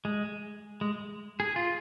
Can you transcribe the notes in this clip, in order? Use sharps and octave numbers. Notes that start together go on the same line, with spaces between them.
G#3
G#3
G#4
F4